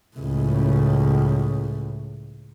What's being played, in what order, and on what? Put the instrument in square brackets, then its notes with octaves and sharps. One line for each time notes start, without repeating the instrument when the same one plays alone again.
[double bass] C#2 A2